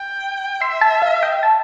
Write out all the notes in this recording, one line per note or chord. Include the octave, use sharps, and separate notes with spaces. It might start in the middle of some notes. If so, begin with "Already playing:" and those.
Already playing: G5
E5 C6
A5
F5
G5
A5